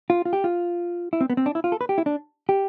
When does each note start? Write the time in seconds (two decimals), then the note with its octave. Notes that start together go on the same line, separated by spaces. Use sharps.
0.10 F4
0.25 F4
0.33 G4
0.44 F4
1.13 E4
1.21 C4
1.30 B3
1.37 C4
1.46 D4
1.55 E4
1.64 F4
1.72 A4
1.81 B4
1.89 G4
1.98 E4
2.06 D4
2.49 G4